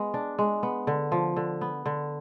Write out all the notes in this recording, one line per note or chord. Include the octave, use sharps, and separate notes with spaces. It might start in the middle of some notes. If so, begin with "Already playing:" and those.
Already playing: G#3 B3
D4
G#3
B3
D3
F3
D3
B3
D3